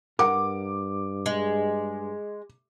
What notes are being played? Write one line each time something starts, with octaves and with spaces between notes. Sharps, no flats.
G2 A#4 F#5 D6
G#3